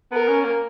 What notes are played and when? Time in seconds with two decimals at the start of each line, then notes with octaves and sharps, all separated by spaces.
0.12 B3 A#4
0.28 C#4
0.44 A#3